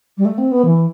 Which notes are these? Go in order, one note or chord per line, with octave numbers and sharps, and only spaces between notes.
G3
A3
C4
B3
E3